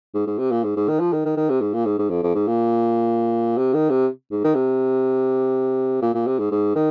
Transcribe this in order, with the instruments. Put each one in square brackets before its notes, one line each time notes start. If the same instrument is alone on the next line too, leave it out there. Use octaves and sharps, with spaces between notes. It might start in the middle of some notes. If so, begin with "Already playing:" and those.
[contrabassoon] G#2
G#2
C3
A#2
G#2
G#2
D#3
F3
D#3
D#3
D#3
C3
G#2
A#2
G#2
G#2
F2
F2
G#2
A#2
C3
D#3
C3
G#2
D#3
C3
A#2
A#2
C3
G#2
G#2
D#3